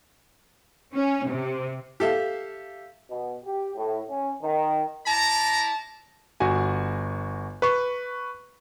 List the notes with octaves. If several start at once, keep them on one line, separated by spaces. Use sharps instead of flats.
C#4
C3
G4 A4 E5 F5
B2
G4
A2
C#4
D#3
E4 D5 A5 A#5
G1 F#4 G#5
B4 C#6